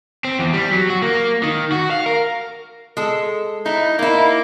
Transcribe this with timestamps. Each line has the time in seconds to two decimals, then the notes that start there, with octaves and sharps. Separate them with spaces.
0.25 C4
0.39 E2
0.53 G3
0.72 F#3
0.90 F#4
1.02 A#3
1.43 D#3
1.72 F#4
1.91 F5
2.06 A#4
2.97 G#3 A4
3.66 D#4 E4
3.99 A#3 D#4 E4